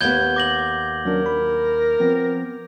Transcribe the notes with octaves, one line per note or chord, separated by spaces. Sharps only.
D#2 B3 G6 G#6 G7
D6 A#6 F#7
F#3 C#4 D4 A#4
B5
F3 B3 C4